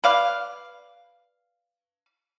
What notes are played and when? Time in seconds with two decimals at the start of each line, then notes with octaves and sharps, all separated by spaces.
0.04 B4 D5 F5